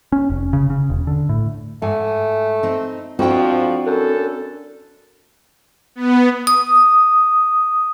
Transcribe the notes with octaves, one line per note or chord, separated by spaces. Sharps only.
C#4
F1
C#3
C#3
E1
D3
A2
G#2 A3 F#5 G#5
C4 D#4
F2 F3 C4 D4 E4 F#4 G5
F#2 A4
B3
D#6